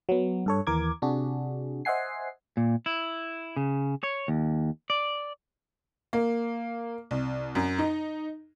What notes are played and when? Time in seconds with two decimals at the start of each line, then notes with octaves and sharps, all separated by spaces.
0.09 F#3 B3
0.46 G2 A4 C#5
0.67 D#2 E3 A#4 D6 G#6
1.02 C3 D4 F#4 G#4
1.85 C5 D#5 E5 F#5 G#5 C7
2.57 A#2
2.86 E4
3.57 C#3
4.03 C#5
4.28 D#2
4.90 D5
6.13 A#3
7.11 C2
7.55 F#2
7.79 D#4